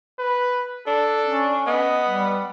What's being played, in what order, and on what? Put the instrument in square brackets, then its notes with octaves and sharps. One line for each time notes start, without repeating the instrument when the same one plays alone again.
[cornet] B4
[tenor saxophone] D4 [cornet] A4
[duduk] C#4
[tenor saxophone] B3 [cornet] D#5
[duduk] G3